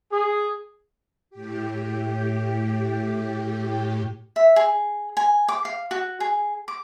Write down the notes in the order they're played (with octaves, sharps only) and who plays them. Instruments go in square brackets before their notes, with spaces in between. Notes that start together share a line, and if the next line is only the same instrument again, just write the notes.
[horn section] G#4
[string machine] A2 G4
[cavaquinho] E5
G#4
G#5
D6
F5
F#4
G#4
D6